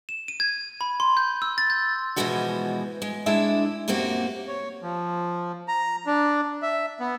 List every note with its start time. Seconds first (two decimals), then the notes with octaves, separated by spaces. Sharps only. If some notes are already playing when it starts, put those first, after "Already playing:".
0.09 E7
0.28 D#7
0.40 G#6
0.81 B5
1.00 C6
1.17 G6
1.42 E6
1.58 A6
1.70 G6
2.16 B2 E3 F3 G#3 B3 F#4
3.02 G#3
3.26 G#3 D4 E4 E5
3.88 F#2 A#2 A#3 C4 F#4 G4
4.48 C#5
4.82 F3
5.68 A#5
6.06 D4
6.62 E5
7.00 B3